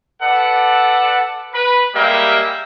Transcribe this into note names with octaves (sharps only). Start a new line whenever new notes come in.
A4 B4 D5 F#5
B4
G3 G#3 A#3 G4 E5